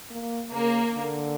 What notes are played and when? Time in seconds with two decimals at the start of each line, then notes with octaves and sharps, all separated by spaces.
0.10 A#3
0.52 C#3 A#3
0.93 D3